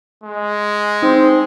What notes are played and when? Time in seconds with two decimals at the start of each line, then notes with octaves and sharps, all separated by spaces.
0.24 G#3
1.03 C4 D#4